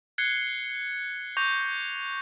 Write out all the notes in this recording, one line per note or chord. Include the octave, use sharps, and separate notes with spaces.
F#6 G#6 C7 C#7 G7
C#6 D6 G6 A#6 F7